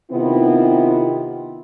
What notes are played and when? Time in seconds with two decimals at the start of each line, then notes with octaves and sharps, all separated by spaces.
0.12 C3 D#3 B3 C4 E4 F4